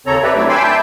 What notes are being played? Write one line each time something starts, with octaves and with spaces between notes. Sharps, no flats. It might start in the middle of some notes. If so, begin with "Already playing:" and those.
D#2 C#3 C4 A4 C#5 A#5
G4 B4 D5 E5
F#3 A3 C4 D4 E4
G5 G#5 B5 C6 D6 E6
E5 A5 G6